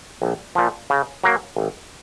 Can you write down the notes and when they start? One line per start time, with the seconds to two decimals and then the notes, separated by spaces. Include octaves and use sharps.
0.22 A#1
0.55 A#2 F3
0.90 C#3
1.24 F#3 A#3
1.57 G#1